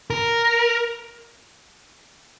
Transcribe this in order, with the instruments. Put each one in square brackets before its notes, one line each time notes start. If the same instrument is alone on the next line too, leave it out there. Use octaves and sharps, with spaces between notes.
[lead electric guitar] A#4